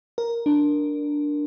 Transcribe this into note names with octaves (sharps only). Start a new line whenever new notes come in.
A#4
D4